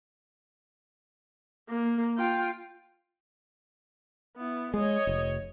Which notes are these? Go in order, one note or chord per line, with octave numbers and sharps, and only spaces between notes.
A#3
F4 G5
B3 E4
G#3 C#5 D#5
F1